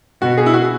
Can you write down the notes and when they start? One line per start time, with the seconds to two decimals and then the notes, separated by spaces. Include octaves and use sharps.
0.22 B2 F#4
0.37 G#4
0.46 E4
0.54 F#4